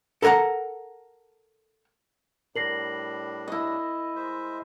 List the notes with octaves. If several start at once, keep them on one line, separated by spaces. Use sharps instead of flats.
A4 A#4 C#5 F#5 A#5
A2 G3 D4 A#4 A#6 C7 F#7
E4 D#5
G#3 C5 E5